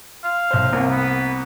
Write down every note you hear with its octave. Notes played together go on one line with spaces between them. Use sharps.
F5
B1 C5
C2 C3 A#3
B3